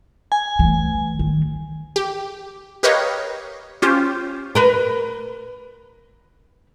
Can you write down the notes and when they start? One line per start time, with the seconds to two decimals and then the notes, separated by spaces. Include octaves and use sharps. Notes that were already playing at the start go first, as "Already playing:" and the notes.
0.32 G#5
0.59 E3 A3
1.19 D#3
1.96 G4
2.83 G4 A#4 B4 C#5 D#5 F5
3.82 C#4 F4 G4 C5
4.55 A#4 B4